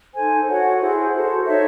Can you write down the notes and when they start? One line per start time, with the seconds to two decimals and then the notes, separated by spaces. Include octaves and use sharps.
0.14 D#4 A4 C5 G#5
0.47 F#4 A4 C#5 F#5
0.80 E4 G#4 C5
1.13 F#4 A4 C5
1.46 D#4 A4 C#5 E5